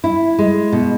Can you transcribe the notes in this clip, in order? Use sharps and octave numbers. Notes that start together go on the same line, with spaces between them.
E4
G#3
B2